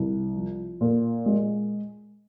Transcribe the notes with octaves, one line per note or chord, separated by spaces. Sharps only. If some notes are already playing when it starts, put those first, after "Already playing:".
Already playing: C2
F3
A#2
G#3